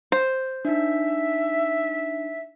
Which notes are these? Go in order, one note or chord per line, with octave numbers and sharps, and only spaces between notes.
C5
D4 D#4 E5